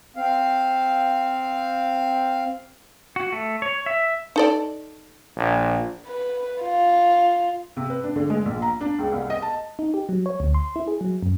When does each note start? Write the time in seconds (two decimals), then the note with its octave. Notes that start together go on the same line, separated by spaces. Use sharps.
0.16 C4 F5
3.16 F#4
3.32 A3
3.62 C#5
3.86 E5
4.36 D#4 A4 D5
5.37 A#1
6.06 B4
6.62 F4
7.77 C3
7.90 B4
8.04 D4
8.16 D3
8.30 G#3
8.45 A#1
8.62 A#5
8.81 D4
8.99 C#2
9.12 C2
9.30 D#5
9.42 A5
9.79 D#4
9.94 G4
10.09 F#3
10.26 C#5
10.40 D2
10.54 C6
10.76 E4
10.87 G#4
11.01 F#3
11.23 F#2